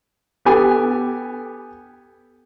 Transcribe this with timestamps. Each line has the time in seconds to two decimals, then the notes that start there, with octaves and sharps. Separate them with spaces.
0.45 B3 G4 A4 G#5